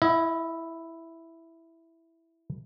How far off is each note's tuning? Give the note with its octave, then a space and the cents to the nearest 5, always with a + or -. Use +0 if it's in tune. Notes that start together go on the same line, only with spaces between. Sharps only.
E4 +0 D#5 +40 F#5 +0